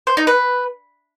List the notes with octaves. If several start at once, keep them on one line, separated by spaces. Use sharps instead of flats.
C5
D#4
B4